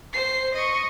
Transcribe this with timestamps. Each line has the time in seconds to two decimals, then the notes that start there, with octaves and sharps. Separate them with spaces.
0.13 C5 C7
0.55 D#5 C#6